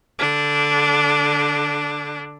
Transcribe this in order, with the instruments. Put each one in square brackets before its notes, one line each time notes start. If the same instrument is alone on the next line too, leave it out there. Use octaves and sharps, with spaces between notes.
[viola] D3 D4